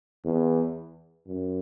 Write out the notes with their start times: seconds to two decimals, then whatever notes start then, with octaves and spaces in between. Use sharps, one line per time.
0.25 E2
1.27 F#2